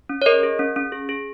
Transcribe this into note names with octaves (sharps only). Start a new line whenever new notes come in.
C#4
C#5
G#4 A#4 D#5
G#4
C#4
C#4
G#4
G#4